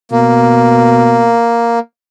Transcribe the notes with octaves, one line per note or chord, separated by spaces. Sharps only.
B2 A#3